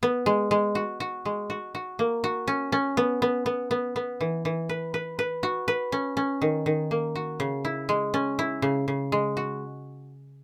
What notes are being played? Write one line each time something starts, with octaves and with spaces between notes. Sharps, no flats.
B3
G#3
G#3
F#4
F#4
G#3
F#4
F#4
A#3
F#4
C#4
C#4
B3
B3
B3
B3
B3
E3
E3
B4
B4
B4
F#4
B4
C#4
C#4
D#3
D#3
A#3
F#4
C#3
E4
G#3
C#4
E4
C#3
C#3
G#3
F#4